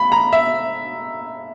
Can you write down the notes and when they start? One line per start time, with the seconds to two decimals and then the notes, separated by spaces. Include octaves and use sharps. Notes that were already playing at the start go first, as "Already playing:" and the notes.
Already playing: B5
0.12 A#5
0.33 E5